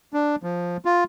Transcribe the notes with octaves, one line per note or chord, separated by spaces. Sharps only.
D4
F3
F4